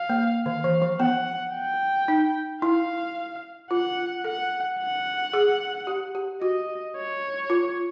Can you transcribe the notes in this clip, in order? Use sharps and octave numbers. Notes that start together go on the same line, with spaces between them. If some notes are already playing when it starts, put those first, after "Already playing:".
Already playing: F5
A#3
D#3 F5
E3
F3
B3 F#5
G5
D#4
E4 F5
F4 F#5
A4 F#5
F#5
G#4
G4
G4
F#4 D#5
C#5
F4